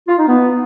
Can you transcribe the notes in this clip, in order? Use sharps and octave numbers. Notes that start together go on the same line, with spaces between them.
F4
D#4
B3